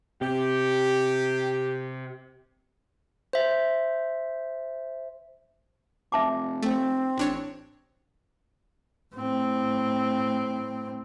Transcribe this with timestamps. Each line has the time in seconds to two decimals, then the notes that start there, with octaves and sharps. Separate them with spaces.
0.21 C3 G4
3.33 C5 E5
6.12 F1 E5 A5 D6
6.63 A3 C4
7.18 A1 D4 C#5
9.15 A2 C4